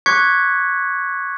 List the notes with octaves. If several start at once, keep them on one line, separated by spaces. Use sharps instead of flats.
C#6 D6 F#6 G#6 B6 C#7